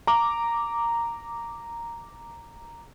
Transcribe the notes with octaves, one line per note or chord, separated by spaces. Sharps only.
A#5 D6